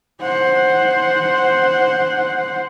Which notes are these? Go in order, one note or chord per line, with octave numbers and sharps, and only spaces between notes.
C5 F#5